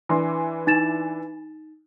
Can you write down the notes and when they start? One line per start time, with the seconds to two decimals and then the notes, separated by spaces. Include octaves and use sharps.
0.09 E3 D4 C6
0.67 D#4 A6 E7